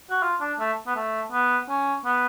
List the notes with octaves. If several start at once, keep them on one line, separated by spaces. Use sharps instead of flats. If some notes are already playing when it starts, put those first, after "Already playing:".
F#4
F4
D4
A3
B3
A3
B3
C#4
B3